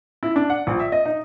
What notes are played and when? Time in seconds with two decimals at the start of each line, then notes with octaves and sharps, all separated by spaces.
0.23 E4
0.36 D4
0.50 F#5
0.67 A#1
0.80 E5
0.92 D#5
1.06 D#4